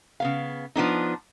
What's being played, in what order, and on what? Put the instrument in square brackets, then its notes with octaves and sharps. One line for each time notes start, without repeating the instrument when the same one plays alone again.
[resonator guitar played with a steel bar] C#3 B3 F5
F3 B3 D4 D#4